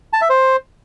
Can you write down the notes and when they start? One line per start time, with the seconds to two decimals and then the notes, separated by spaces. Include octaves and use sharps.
0.13 A5
0.21 E5
0.30 C5